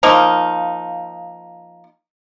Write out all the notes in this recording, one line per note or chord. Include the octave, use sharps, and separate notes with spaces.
F3 A#3 D#4